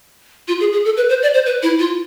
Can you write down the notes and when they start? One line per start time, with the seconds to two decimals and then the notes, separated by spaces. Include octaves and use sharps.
0.48 F4
0.60 G#4
0.72 G#4
0.85 A4
0.97 B4
1.09 C5
1.22 D5
1.34 C5
1.46 B4
1.63 E4
1.79 F4